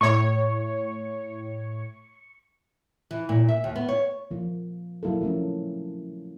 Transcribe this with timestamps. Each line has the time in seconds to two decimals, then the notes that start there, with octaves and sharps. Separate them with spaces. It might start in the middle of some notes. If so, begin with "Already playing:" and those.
0.01 A2 C#5 C#6
3.11 E3
3.29 A#2
3.48 E5
3.64 D#2
3.76 B3
3.89 C#5
4.31 F3 A#3
5.03 F#3 A#3 E4 A4
5.21 F3 A3 C#4